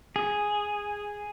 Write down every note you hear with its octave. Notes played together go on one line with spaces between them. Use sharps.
G#4